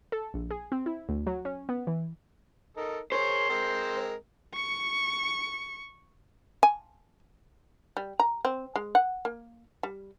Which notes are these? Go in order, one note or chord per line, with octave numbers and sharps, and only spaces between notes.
A4
A#1
G#4
C4
E4
D2
F#3
C#4
B3
E3
D#4 A4 A#4
G#4 A#4 C5 C#5
G#3 C4 A#4
C#6 C#7
G#5
G3
A#5
C4
G#3
F#5
A#3
G3